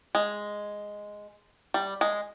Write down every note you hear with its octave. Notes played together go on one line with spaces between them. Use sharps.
G#3
G3
G#3